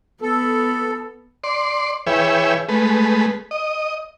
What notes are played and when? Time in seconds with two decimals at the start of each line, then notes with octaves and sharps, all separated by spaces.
0.22 B3 A4
1.44 D5 C6
2.07 E3 G#4 B4 C#5 E5 G5
2.69 G#3 A3 B4
3.51 D#5